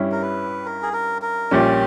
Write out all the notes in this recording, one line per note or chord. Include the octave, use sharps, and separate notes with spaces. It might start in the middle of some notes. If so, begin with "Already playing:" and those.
Already playing: G2 G3 C#4 E4
A#4
B4
A#4
G#4
A#4
A#4
A#1 A#2 G3 C#4 G4